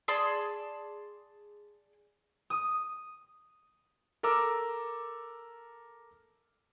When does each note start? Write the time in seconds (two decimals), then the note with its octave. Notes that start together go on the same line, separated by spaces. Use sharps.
0.08 G#4 D5 A5 C6
2.50 D#6
4.23 A4 A#4 A#5 D6 E6